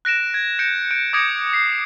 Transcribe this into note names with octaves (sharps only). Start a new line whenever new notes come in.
F#6 A#6 D7 E7
G#6
G6 A#6 C#7 D7 E7
G6 D7
D6 D#6 G#6 A#6 C#7 D7
C7 C#7